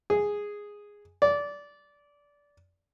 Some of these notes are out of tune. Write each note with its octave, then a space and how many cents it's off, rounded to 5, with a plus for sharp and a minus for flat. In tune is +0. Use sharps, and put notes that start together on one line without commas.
G#4 -5
D5 -20